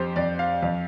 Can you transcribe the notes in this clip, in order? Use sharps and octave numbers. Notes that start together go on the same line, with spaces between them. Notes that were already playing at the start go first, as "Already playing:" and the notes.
Already playing: F2 G4 C5
F2 D5
F5
F2